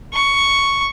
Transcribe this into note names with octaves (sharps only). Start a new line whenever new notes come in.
C#6